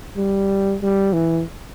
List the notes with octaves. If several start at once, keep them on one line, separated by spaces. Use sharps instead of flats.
G3
G3
E3